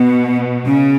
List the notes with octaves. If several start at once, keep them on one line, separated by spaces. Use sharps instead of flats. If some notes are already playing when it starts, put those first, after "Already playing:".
Already playing: B2 B3
C#3 C#4